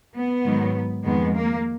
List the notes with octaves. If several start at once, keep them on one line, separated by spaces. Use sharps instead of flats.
B3
G#2 D#3 F#3
F2 D#3 G#3 B3
A#3